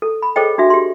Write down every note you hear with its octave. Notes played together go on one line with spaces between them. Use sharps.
A4
B5
G#4 A4 C5 C#5 D#5 G5
D4 F#4 E5
G4 C6